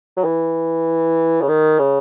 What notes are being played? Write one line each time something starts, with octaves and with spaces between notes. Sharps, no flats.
F#3
E3
C#3
D#3
C#3